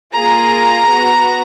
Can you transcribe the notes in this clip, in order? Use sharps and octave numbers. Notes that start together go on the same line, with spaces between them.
A#3 F4 G#4 A#5
B3 F#4